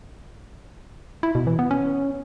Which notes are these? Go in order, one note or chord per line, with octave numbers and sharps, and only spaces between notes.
E4
B2
E3
B3
C#4